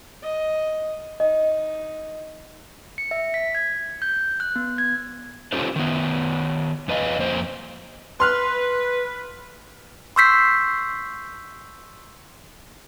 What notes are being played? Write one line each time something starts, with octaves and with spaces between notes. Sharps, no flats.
D#5
D#4 D#5
C#7
E5
B6
G#6
G6
F#6
B3
G#6
C#4 D#4 F4 G4 A4 C5
D#3 B3
F2 B4 D#5 F5
F2 A#3 C5
B4 C6 F6 F#6
C6 C#6 E6 G6 B6 C7